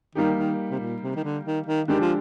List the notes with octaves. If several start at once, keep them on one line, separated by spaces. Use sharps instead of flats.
D#3 G3 A#3 D#4 G4
D#3
C3
A#2
C3
D#3
D3
D#3
D#3
D3 D#3 G#3 D4 G4
F3